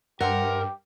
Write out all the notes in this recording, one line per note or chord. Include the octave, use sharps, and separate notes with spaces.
G2 G4 A#4 C5 E5 F#5